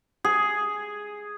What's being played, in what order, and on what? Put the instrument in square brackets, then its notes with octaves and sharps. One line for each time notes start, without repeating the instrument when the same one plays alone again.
[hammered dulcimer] G#4